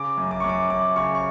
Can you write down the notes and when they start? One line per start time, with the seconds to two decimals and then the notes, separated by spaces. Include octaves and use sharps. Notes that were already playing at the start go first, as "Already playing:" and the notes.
Already playing: C#3 D6
0.17 F#2
0.31 D6
0.40 F#2 C#6
0.49 D6
0.70 F#2 D6
0.96 C#3 C#6
1.15 C#6